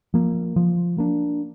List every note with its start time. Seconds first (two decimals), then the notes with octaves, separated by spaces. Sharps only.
0.14 F3 A#3
0.56 F3
0.98 A#3 D4